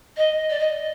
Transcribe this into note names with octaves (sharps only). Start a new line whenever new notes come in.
D#5
D5
D#5